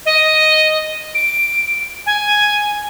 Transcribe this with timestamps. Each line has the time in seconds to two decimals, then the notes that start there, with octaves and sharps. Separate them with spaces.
0.05 D#5
1.14 D7
2.06 G#5